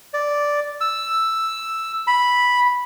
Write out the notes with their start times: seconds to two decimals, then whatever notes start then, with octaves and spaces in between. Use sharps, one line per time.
0.14 D5
0.81 E6
2.07 B5